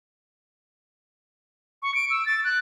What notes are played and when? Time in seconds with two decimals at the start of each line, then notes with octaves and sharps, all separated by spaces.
1.82 C#6
1.95 D7
2.10 E6
2.26 A6
2.44 F#6